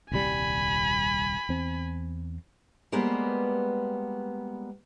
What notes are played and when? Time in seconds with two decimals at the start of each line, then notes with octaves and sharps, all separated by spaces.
0.12 D#1 C2 G3 G#5 B5
1.49 E2 C4
2.92 G3 G#3 A#3 B3 B4 C5